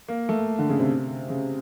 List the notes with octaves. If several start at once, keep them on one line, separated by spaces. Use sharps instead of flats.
A#3
A3
D3
C#3
C3
C#3